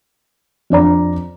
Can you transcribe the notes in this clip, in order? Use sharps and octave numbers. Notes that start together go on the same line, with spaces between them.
F2 D4 D5 A#5